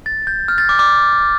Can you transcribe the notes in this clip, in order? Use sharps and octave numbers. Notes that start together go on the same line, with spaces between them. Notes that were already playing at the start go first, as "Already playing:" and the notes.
A6
G6
F6
A6
D6
D6